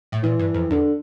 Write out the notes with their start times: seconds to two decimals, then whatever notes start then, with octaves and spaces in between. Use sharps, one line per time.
0.12 A2
0.23 A#2 E3
0.39 G2
0.54 F2
0.70 E2 D3